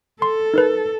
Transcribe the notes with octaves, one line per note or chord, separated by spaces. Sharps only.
A4 C6
D#4 A#4 B4